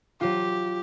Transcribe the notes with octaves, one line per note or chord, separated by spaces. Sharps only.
F#3 F4 G4